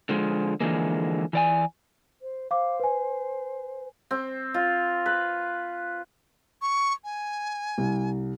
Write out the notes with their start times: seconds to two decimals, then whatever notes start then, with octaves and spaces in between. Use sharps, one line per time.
0.09 D3 F3 G#3
0.60 D3 E3 F3 G#3 A#3
1.33 E3 D5 G#5
2.21 C5
2.51 C5 F5 D6
2.80 B4 G#5
4.11 C4
4.54 F4
5.06 B4
6.62 C#6
7.04 G#5
7.78 C2